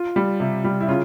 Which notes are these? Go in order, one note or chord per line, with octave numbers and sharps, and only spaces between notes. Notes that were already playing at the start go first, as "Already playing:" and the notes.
Already playing: F4
G3
C3
G3
E4
C#3 F4